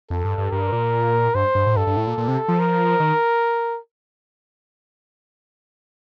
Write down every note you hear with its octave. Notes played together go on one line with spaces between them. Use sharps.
F2 A4
G2
G2
G2 A#4
A#2
G2 C5
G2
A2
G2 A4
G2
A2
A#2
A#2
C3
F3
A#4
D#3